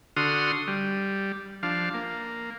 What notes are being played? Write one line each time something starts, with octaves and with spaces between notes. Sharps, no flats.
D3 F#4 C6 D#6 F6
G3
F3 D4 F5
A#3